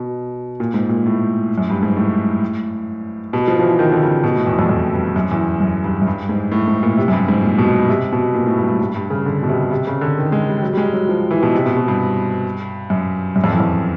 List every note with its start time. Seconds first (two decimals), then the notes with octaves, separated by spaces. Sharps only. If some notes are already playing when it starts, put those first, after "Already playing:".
Already playing: B2
0.60 A#2
0.74 G#2
0.89 A#2
1.06 A2
1.58 F#2
1.70 G2
1.83 G#2
1.97 A2
3.33 B2
3.48 F3
3.59 F3
3.63 E3
3.79 D#3
3.92 D3
4.02 C#3
4.24 B2
4.35 A2
4.47 E2
4.59 F2
4.69 F2
4.93 G2
5.16 F#2
5.31 E2
5.60 F#2
5.84 G2
6.02 F#2
6.07 G2
6.29 G#2
6.52 A2
6.68 G#2
6.83 A#2
6.97 C3
7.08 F#2
7.13 G2
7.28 G#2
7.43 A#2
7.58 B2
7.88 C3
8.12 B2
8.34 A#2
8.46 A2
8.57 G2
8.68 G2
8.80 G2
8.95 G2
9.10 C#3
9.26 D3
9.43 B2
9.49 C3
9.71 C3
9.87 C#3
10.01 D3
10.17 D#3
10.32 G#3
10.48 G3
10.62 F#3
10.73 G3
10.77 G#3
10.86 G3
10.93 F#3
11.09 F3
11.31 E3
11.43 B2
11.54 C3
11.66 B2
11.77 B2
11.88 G2
12.90 F#2
13.36 F#2
13.44 F2
13.52 E2
13.60 F2